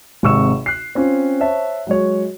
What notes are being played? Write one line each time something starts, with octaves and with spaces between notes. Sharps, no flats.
G#1 C3 C#6 E6 E7
F#6 C7
C4 C#4 F4
C5 C#5 E5 A5
F#3 G#3 C#5